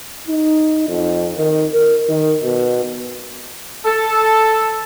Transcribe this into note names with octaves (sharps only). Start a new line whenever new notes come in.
D#4
F2
D#3
A#4
D#3
B2
A4